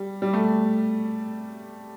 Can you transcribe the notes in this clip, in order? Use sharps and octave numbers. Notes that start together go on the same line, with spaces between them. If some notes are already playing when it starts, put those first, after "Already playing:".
Already playing: G3
G3
A3